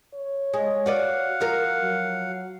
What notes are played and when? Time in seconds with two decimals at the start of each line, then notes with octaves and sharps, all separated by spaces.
0.14 C#5
0.54 G#3
0.86 F#4 B4 D5 F5 F#5
1.40 F3 F#4 A#4
1.82 F#3